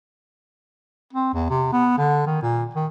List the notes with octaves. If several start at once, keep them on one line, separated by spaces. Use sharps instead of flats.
C4
E2
C3
B3
D3
D#3
A#2
D#3